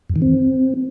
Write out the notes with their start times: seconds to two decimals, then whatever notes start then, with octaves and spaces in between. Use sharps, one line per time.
0.10 F#2
0.16 D#3
0.22 C4